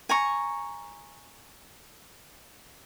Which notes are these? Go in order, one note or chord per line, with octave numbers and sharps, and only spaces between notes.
G#5 A#5 C#6